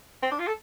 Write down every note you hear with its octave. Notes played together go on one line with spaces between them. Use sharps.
C4
D4
F4
A4